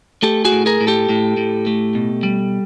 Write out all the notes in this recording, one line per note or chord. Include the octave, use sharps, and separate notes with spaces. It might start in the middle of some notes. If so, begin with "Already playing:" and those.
A3 G4 A4
F#4 G#4
A2
G#4 A#4
A2
G4 A4
A2
A2
A3
B2
G3